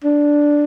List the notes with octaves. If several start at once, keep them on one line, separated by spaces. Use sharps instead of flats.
D4